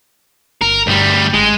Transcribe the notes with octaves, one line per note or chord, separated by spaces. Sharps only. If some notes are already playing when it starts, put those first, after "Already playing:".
G1 A#4
D2 G2 G3
G#1 G#3